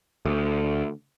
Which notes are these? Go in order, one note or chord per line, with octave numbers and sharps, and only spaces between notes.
D2